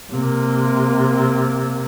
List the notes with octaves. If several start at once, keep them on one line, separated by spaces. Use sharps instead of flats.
C3 A#3